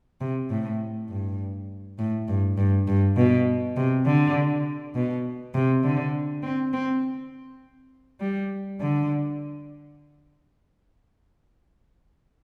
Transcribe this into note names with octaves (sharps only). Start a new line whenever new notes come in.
C3
A2
G2
A2
G2
G2
G2
B2
C3
D3
B2
C3
D3
C4
C4
G3
D3